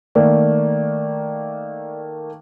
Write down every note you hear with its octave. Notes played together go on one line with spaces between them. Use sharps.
D#3 A3 A#3 D5